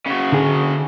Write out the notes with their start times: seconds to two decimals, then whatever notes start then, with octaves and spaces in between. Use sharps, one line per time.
0.06 C#3 F#4
0.32 D3 G#4